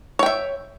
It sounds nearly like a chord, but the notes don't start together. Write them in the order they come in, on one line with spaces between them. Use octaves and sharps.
C#5 G5 E5